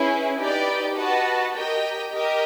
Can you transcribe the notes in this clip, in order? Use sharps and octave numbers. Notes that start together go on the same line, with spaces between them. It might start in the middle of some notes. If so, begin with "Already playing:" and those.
Already playing: C#4 E4 G#4 B4
D#4 G4 B4 D5 G5
F#4 B4 D#5 F#5 A5
G4 A#4 D#5 G5
G4 A#4 D#5 G5